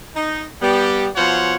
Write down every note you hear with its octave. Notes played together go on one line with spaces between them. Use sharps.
D#4
G3 B3 G4
B2 F3 F4 C5 C#5 F#5